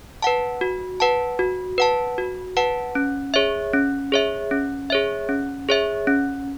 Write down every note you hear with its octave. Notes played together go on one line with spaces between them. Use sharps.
B4 F#5 A5
F#4
B4 F#5 A5
F#4
B4 F#5 A5
F#4
B4 F#5 A5
C#4
G#4 C#5 E5
C#4
G#4 C#5 E5
C#4
G#4 C#5 E5
C#4
G#4 C#5 E5
C#4